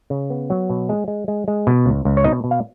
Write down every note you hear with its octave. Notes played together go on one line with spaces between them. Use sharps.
C#3
B3
F#3
B2
G#3
G#3
G#3
G#3
B2
C#2
C#2
C#5
B2 D#4 D#5
B2
F5